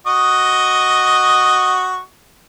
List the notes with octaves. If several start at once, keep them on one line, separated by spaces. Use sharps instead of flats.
F#4 D#5 C#6